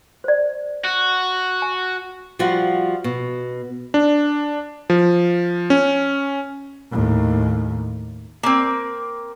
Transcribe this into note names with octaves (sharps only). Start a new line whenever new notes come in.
C5 D5
F#4
G#5
F3 G3 F4 F#4
B2
D4
F3
C#4
D#2 A2
A#3 C4